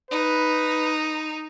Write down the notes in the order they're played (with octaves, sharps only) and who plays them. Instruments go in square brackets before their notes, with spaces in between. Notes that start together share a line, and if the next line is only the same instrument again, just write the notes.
[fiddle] D#4 [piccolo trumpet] B4